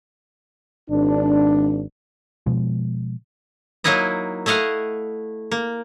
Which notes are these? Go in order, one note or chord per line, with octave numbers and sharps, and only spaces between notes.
G#1 D4
B2 F3 G#3
F#3 A#3 D#4 E4 D#5
A3 E4 D#5 F5 F#5
A#3